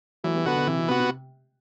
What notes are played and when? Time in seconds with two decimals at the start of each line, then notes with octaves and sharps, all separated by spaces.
0.24 E3 F#3 A3
0.35 G3 B3
0.45 D3 F#3 B3 F#4
0.56 B2 D3
0.67 C3 E3
0.78 B2
0.88 C3 B3 F#4
1.00 C3